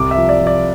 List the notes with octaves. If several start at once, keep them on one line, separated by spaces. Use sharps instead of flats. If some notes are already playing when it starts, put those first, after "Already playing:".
Already playing: C2 D6
E5
F3
D5
F3
D5